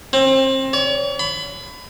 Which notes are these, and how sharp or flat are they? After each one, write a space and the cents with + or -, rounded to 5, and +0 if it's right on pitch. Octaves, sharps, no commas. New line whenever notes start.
C4 +30
C#5 +45
B5 +25